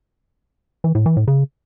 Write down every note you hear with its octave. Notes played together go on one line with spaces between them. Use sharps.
E3
A2
E3
A2
C#3